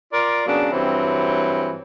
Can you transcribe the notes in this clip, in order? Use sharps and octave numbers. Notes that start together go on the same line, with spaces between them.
F4 A#4 D5
C#3 F#3 A#3 B3 D4
G2 E3 F#3 C4